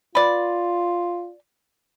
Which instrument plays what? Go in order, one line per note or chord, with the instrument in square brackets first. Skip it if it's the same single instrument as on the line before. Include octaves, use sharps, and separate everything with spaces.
[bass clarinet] F4 [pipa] B4 D5